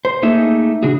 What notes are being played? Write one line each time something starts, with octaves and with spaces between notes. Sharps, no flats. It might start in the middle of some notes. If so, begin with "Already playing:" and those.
C5
A3 A#3 D#4 G#4 E5
C#3 D4 F#4 G#4